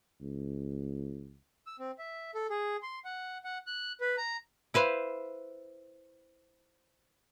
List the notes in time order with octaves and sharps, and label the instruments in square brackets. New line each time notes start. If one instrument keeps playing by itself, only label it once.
[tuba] C#2
[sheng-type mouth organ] E6
C4
E5
A4
G#4
C6
F#5
F#5
F#6
B4
A#5
[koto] E4 B4 C5 F5